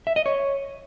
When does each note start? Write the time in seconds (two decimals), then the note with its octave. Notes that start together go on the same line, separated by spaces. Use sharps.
0.07 E5
0.16 D#5
0.26 C#5